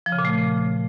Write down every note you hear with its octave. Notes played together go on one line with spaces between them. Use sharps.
F3
C#3
A#2
A3